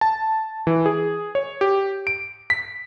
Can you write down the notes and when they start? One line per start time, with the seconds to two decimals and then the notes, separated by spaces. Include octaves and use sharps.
0.01 A5
0.67 E3
0.86 G#4
1.35 C#5
1.61 G4
2.07 D7
2.50 B6